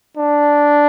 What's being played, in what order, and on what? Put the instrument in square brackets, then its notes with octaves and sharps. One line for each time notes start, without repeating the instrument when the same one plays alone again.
[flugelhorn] D4